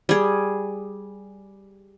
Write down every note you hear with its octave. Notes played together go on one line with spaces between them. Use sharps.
G3 G#4